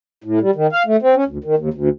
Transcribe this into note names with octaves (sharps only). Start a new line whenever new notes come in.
A2
G3
D#3
F5
A3
C4
C#4
D2
D#3
D#2
D2